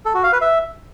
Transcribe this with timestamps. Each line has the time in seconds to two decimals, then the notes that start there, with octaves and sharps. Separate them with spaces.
0.05 A4
0.14 F#4
0.23 F5
0.32 B4
0.41 E5